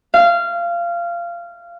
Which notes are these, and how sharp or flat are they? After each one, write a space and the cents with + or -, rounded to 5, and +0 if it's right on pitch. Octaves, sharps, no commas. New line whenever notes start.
F5 -20